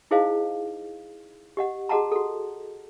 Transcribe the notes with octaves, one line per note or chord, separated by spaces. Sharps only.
D#4 E4 G#4 C5 D#5 F5
G4 D#5 F#5
F#4 G#4 D#5 F#5 A5 A#5
F#4 A4